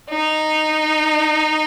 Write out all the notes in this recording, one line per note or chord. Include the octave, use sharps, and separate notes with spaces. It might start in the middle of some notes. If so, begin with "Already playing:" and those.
D#4